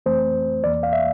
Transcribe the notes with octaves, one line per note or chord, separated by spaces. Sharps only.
F2 E3 A3 C4 C5
E2 E3 A#3 D5
F5
E5